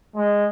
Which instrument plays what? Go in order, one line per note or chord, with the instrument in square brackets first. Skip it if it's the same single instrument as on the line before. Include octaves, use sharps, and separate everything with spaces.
[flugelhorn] G#3